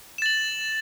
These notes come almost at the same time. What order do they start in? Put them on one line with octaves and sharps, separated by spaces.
E7 A6 F#7